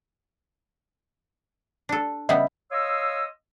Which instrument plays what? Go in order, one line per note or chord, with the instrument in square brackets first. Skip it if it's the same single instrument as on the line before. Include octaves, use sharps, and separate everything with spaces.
[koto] D4 A4
[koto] C#3 G3 B3 [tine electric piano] D#5 E5
[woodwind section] C#5 D#5 F5 C6 D#6 E6